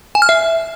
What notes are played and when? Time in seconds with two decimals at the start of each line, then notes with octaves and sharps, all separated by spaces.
0.15 G#5
0.22 F6
0.29 E5